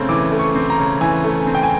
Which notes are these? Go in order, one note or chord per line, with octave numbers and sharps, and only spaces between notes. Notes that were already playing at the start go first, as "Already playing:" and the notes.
Already playing: C#3 A3 C4
E3 D6
A3
C#6
C4
A#5
C#3
E3 G#5
A3
C4
G5
G#5